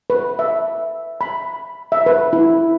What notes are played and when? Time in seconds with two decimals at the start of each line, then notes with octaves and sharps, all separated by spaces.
0.10 B4
0.39 E5
1.21 B5
1.92 E5
2.06 B4
2.33 E4